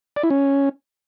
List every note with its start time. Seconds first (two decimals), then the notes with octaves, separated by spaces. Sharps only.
0.16 D5
0.23 E4
0.30 C#4